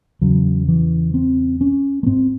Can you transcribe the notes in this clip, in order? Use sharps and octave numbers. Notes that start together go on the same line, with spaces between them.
E2 C#3 F#3
E3
C4
C#4
A3
G#2 C4